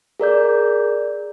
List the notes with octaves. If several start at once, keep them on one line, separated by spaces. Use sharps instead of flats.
G#4 A#4 D5 G6